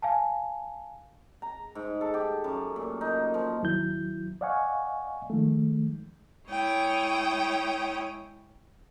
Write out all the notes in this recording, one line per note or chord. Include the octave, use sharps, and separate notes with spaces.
F5 G#5 A5
A#5
G#2
A4
G4
F#2
A#2
D#4
F3
D#2 F#3 E4 G6
D5 D#5 F5 F#5 G#5 C#6
D#3 F3 G#3 A3
G#3 E4 C#5 G5 D#6